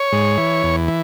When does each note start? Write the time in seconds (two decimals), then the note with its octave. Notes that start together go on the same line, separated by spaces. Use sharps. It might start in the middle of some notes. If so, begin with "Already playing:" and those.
Already playing: C#5
0.12 G#2
0.37 E3
0.63 E2
0.88 E3